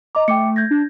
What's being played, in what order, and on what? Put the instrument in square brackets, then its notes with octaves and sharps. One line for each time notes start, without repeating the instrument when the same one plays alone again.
[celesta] D#5 D6 [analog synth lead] A#5
[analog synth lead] A3 [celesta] G5 D6 C#7
[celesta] G6 G#6 A#6
[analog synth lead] D4